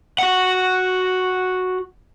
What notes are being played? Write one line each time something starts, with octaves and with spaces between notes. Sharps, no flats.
F#4 F#5